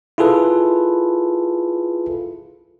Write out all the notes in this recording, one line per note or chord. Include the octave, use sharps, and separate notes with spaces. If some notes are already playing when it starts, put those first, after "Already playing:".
E4 F4 G#4 A4 B4